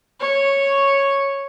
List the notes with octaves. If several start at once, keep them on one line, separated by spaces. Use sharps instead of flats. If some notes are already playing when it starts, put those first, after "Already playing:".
C#5